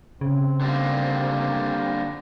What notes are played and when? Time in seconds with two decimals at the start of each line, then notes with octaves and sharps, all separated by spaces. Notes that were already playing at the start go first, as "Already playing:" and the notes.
0.21 C#3 C4
0.60 D3 G3 A#3